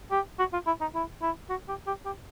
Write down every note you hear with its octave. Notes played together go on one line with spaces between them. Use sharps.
G4
F#4
F4
E4
D#4
E4
E4
F#4
G4
G4
G4